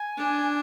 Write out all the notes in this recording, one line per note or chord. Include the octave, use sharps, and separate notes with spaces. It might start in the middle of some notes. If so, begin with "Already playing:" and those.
Already playing: G#5
D4